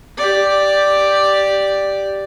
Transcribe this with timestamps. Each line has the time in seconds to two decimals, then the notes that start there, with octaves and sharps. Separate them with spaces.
0.17 G4 D5